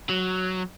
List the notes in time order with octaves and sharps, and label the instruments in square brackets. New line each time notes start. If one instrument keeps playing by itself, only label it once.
[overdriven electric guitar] F#3